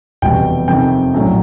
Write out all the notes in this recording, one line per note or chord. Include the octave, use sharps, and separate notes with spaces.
F1 E2 B2 G3 G5
F2 C3 D#3 G5
A#1 A2 F#3 A3